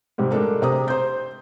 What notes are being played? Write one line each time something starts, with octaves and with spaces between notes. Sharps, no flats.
G#2 C3 G3
G#3 A3 D4 A4 A#4
C3 A#5 D#6
C5 G6